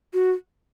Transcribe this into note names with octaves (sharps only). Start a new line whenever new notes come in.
F#4